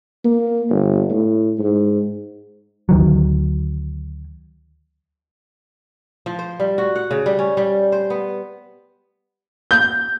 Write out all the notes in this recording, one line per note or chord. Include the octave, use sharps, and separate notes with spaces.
A#3
G1
A2
G#2
D2 D#3 F#3
F3
C5
G3
F#4
F#5
C#3
G3
C#4
G3
C5
B3
G6